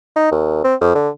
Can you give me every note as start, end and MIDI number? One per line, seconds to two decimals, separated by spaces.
0.16 0.30 63
0.31 0.63 39
0.64 0.75 60
0.81 0.92 41
0.95 1.09 50